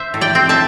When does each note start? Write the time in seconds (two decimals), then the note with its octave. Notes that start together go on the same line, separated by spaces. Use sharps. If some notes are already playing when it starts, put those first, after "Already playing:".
Already playing: C5 E5
0.14 A2
0.21 D5 G5
0.35 C4
0.49 E5 A5